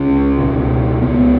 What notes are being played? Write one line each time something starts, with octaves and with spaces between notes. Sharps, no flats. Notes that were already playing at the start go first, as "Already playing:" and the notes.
Already playing: C#2 C#3 C#4
C#2 B2
C#2 C#3 B3